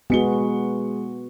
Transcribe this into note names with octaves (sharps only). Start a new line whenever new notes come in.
G#3 B3 F#4 C#7 G7